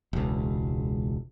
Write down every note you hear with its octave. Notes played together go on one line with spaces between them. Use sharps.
E1 C#2